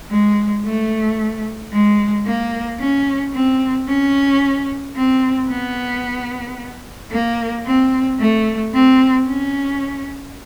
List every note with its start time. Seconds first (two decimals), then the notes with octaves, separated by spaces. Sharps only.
0.10 G#3
0.65 A3
1.72 G#3
2.26 A#3
2.80 C#4
3.34 C4
3.88 C#4
4.96 C4
5.49 B3
7.11 A#3
7.66 C4
8.20 A3
8.74 C4
9.27 C#4